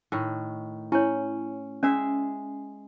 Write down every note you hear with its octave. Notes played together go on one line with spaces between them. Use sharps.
A2 D#3
C#4 E4 C#5
G#3 C#4 G#4 D5 E5